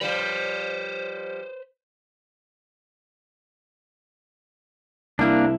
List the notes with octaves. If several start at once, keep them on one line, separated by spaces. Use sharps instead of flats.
F3 G3 B4 C5
C2 A#3 D4 E4